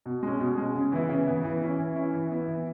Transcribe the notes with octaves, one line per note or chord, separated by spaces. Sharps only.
B2
G#3 C#4
B2
G#3 C#4
C#3
E3 B3 E4
C#3
E3 B3 E4
E3
C#4 E4
E3
C#4 E4
E3
B3 E4
E3